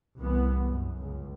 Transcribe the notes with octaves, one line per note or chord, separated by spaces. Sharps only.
C2 A2 E3 B3
F#2
C#2